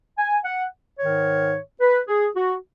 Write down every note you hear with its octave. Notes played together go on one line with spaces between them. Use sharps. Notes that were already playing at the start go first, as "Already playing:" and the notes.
G#5
F#5
G#2 D#3 C#5
B4
G#4
F#4